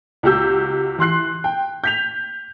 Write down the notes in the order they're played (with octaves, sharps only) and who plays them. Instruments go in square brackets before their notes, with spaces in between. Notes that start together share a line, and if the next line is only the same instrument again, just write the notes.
[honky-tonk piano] C#2 F#4 G4 E6 G6
E3 C6 F#6 C7
G5
G6 B6 F7